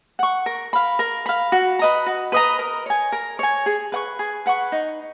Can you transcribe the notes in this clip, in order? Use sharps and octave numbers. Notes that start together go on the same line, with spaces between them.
F#5 C#6
A#4
F5 B5
A#4
F5 B5
F#4
B4 D#5 A#5
F#4
B4 D#5 A#5
A#4
C#5 G#5
A#4
C#5 G#5
G#4
B4 F#5 C#6
G#4
B4 F#5 C#6
D#4